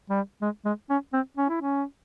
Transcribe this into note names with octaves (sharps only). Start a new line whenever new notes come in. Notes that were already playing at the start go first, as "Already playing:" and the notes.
G3
G#3
G#3
C#4
C4
C#4
E4
C#4